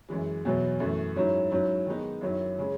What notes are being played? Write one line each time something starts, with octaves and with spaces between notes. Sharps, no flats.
F#2 E3 G#3
E2 B2 F#3 B3
F#2 E3 A3
G#2 F#3 C#4 E4
G#2 F#3 C#4 E4
D#3 G#3 B3 D#4
F#2 D#3 F#3 C#4 E4
C#3 G#3 C#4